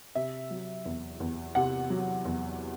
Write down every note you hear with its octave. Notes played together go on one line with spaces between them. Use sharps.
C3 E5
F#3
E2
E2
C3 F#5
F#3
E2